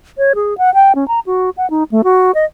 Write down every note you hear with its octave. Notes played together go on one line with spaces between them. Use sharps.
C#5
G#4
F#5
G5
C#4
A#5
F#4
F#5
D#4
A3
F#4
D#5